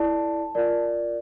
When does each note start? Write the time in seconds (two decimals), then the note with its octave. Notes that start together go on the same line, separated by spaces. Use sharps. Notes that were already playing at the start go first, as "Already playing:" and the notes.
Already playing: E4 A4 D5 A5
0.55 F4 A#4 D5